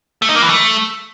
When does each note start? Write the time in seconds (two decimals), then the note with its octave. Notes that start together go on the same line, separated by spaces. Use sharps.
0.22 A3
0.29 D#4
0.35 A#3
0.42 E3
0.49 A3